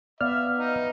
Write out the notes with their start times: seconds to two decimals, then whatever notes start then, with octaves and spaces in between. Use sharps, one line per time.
0.21 B3 D5 E5 F5 F6
0.58 D#4